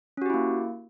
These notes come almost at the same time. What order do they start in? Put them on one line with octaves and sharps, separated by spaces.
C#4 F#4 G4 E4 A#3